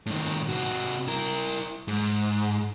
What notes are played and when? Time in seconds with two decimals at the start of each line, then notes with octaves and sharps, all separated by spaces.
0.06 A2 D#3
0.49 C3 F#4
1.08 E4 A#4
1.88 G#2